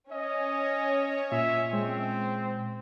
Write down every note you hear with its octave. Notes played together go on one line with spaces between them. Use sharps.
C#4 C#5 D#5
A#2 E5
G#3 C4